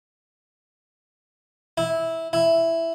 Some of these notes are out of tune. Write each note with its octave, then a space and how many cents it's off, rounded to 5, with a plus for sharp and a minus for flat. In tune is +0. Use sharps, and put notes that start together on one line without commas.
E4 -10
E4 +5